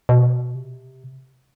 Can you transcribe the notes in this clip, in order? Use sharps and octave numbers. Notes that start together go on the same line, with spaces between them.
B2
C3